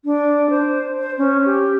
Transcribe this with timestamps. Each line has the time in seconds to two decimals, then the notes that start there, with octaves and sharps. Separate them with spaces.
0.05 D4
0.50 C5
0.99 C5
1.18 C#4
1.46 G4